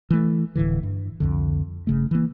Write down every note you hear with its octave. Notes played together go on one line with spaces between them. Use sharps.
E3 A3
D1 A2 D3 E3
G2
C2 F2 D3
G1 C#3 A3
E3 A#3